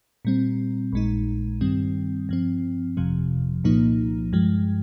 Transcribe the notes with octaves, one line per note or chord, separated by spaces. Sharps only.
A#2 G3 C4
A#1 A#2 G#3 D#4
G2 D#3 G3 C4
G2 F3 C4
G1 F2 C3 F3
C2 A#2 F3 A#3 D#4
G2 F3 G#3